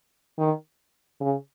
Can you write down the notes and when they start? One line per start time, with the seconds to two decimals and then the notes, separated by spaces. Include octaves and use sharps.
0.38 D#3
1.21 C#3